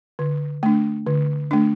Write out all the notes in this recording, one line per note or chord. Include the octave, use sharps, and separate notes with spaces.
D3
A3 D4
D3
A3 D4